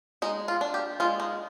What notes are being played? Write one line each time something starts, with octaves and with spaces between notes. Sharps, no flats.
G#3 D#4
F4
D4
G4
G#3 F4
D#4